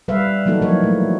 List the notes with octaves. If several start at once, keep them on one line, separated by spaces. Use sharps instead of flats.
G3 B4 E5 F5
E3 F#3 A#3 D#4 F#4 A4
F3 F#3 E4 A#4 C#5
A3